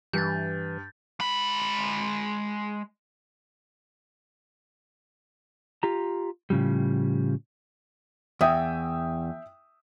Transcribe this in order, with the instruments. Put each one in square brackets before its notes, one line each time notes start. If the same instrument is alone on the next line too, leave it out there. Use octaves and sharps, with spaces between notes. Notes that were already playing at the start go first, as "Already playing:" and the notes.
[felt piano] G2 [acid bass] E3 [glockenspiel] G6 A6
[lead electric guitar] G#3 B5
[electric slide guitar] F4 G4 A#5
A2 C#3 F3 G3
[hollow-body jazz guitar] E2 [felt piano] E5 G5 D#6